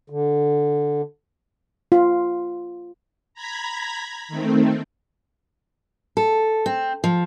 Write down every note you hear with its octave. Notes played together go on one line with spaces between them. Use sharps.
D3
F4
A#5 B5 G#6 B6
D#3 A3 C4
A4
C4
F3